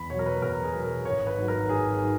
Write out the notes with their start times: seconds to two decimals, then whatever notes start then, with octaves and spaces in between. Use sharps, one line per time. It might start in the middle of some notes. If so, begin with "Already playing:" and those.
Already playing: E2 B5
0.09 B2 C#5
0.14 F#3
0.19 A#4
0.26 B4
0.42 E2 A#4
0.63 G#4
0.73 B2 F#3
0.84 A#4
1.05 G#1 C#5
1.27 B4
1.37 G#2 D#3 F#3
1.48 A#4
1.69 G#1 G#4
2.01 D#3 F#3